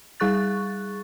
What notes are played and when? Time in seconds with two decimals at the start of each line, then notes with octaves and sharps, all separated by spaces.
0.20 G3 G#4 C#6 F#6 A6